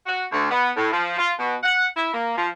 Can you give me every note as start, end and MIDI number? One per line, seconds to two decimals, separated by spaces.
0.06 0.24 66
0.32 0.48 38
0.50 0.70 59
0.76 0.92 45
0.92 1.15 53
1.18 1.32 65
1.38 1.55 47
1.63 1.87 78
1.95 2.10 64
2.13 2.32 58
2.36 2.46 53